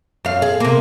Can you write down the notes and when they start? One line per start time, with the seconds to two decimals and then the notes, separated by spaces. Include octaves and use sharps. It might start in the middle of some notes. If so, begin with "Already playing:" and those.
0.25 F#2 F5
0.42 G#4
0.60 C3 A#3